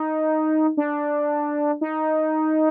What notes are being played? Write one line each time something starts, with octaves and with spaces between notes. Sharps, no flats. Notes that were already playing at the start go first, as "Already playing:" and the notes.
Already playing: D#4
D4
D#4